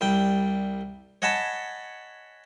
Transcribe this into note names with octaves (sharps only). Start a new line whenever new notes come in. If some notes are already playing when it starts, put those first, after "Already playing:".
C2 G3 G5
C#5 D#5 F#5 G#5 A5 B5